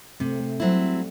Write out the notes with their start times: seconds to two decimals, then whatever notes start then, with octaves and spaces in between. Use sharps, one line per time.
0.20 C3 A3 C4
0.40 A3
0.60 F#3 G3 C4 E4